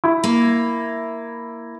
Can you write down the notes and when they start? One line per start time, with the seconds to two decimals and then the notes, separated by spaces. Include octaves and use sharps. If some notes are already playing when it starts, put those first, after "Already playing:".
0.04 E4
0.24 A#3